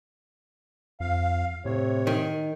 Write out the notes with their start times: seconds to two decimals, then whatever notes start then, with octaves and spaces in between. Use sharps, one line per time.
1.00 F2 F5
1.65 A2 C3 C#5
2.07 D#3